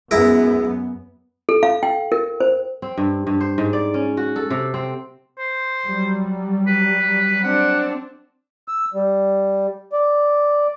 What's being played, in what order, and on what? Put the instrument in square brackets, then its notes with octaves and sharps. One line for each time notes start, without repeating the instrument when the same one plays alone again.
[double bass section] F#2 B3 [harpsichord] G#3 E4 A#4
[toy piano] A4
F5
G5
A#4
C5
[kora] C4
G2
G2
C5
G#2
D5
C#4
F#4
A4
C3
C4
[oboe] C5
[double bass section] F#3 G3
[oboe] B4
[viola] C4 D4 [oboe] F#5
[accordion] E6
G3
D5